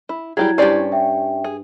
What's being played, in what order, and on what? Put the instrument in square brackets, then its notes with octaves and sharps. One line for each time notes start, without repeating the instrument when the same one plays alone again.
[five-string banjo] E4
[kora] F#3 [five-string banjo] G3 G4 G#4 [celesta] E4 G#6
[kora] G2 G4 C5 [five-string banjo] C#4 D5
[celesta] E5 G5
[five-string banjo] G#4